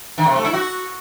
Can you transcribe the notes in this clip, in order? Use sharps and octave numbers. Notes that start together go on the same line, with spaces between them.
D#3
C3
A3
E4
F#4